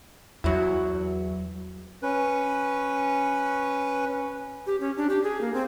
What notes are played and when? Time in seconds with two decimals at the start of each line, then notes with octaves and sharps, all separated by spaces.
0.44 E2 F#3 E4
2.03 C#4 B4
4.67 G4
4.80 C#4
4.97 D4
5.09 G4
5.24 G#4
5.41 A#3
5.54 C4